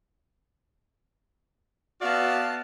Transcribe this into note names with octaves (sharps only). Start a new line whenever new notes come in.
B3 F#4 D5 E5 F5 A5